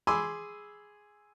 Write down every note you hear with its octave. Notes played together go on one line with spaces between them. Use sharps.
G#4 G#5 B5 C6 D6 E6